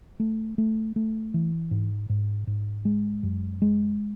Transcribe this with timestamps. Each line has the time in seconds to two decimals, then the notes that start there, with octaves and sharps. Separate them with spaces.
0.20 A3
0.58 A3
0.96 A3
1.34 E3
1.71 G#2
2.09 G#2
2.47 G#2
2.85 G#3
3.23 F#2
3.62 G#3